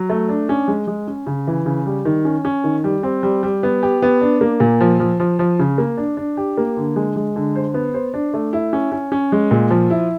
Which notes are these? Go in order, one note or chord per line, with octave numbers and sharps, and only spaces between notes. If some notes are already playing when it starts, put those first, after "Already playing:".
Already playing: F#3
A3
D4
C#4
G#3
G#3
C#4
C#3
E3
C#3
G3
D#3
C#4
C#4
D#3
G3
C4
G3
G3
B3
G4
B3
D4
A#3
A#2
F3
F3
F3
F3
C#3
A#3
D4
D4
G4
A#3
D3
G#3
G#3
D3
C5
B3
C5
D4
A3
E4
C#4
C#4
C#4
G#3
A#2
F3
E4